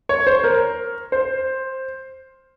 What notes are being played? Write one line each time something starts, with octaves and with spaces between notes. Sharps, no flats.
C#5
C5
A#4
C5